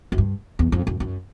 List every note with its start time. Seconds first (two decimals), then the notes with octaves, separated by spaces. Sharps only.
0.12 F#2
0.18 G2
0.59 E2
0.72 F2
0.87 F#2
1.00 F#2